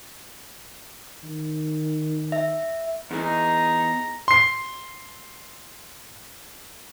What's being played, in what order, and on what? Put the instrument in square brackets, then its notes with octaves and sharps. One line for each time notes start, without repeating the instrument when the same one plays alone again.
[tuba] D#3
[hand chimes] E5
[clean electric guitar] E2 [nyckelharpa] D#4 G#4 [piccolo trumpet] A#5
[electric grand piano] C6 C7